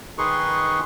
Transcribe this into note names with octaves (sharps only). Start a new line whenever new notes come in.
D#3 D#4 G#4 B4 C6 C#6